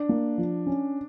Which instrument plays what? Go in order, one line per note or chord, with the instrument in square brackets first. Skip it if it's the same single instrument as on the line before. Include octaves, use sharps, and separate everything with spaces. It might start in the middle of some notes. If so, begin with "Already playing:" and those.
Already playing: [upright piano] D4
[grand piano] A#3
F3
C#4